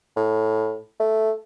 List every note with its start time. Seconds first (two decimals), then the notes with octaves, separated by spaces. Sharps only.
0.17 A2
1.00 A3